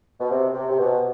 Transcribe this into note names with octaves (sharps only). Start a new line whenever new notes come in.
B2
C3
C3
C3
B2